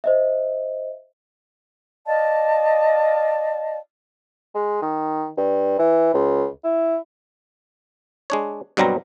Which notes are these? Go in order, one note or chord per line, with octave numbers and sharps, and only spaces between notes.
C5 D#5 E5
D5 D#5 F5 A5
G#3
D#3
G2
E3
C#2
E4
G#3 D4 C#5
G2 B2 F#3 G3 C4 A#5